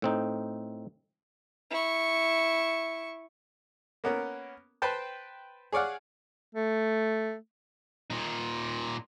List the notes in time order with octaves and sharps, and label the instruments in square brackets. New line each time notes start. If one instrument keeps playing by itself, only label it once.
[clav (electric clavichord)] A2 C4 D#4
[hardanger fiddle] E4 C#6
[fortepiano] A#3 B3 C#4 A#4
B4 C5 G5 A5
G#4 C#5 D5 F5 F#5
[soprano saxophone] A3
[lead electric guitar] A#2 D#4